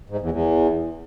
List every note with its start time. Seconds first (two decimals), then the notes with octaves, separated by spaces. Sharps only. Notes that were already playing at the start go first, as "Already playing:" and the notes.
0.10 G#2
0.21 E2
0.32 E2